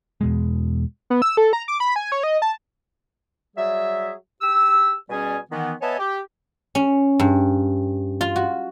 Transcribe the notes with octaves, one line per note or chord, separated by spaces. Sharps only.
E2 B2 G#3
B3
E6
A4
A#5
D6
B5
G#5
C#5
D#5
A5
F#3 G3 G#4 E5
G4 E6
B2 G3 C#4 G#4 D5 G#5
D#3 E3 B3
B3 C#5 D#5 E5 G#5 A5
G4
C#4
G2
F4
F#4